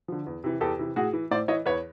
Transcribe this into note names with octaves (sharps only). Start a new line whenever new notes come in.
D3 F3
E2
C3 E3
E2 G4 A4
C3 E3
A2 F#4 G#4
E3
A2 C5 D5
E3 C#5 D#5
E2 B4 C#5